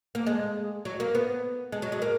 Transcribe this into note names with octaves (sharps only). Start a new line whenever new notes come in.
A#3
G#3
F#3
A#3
B3
G#3
F#3
G#3
A#3